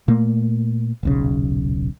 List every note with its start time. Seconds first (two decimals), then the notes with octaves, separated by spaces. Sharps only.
0.08 A#2 A3 A#3
1.03 D#1 B1 C#3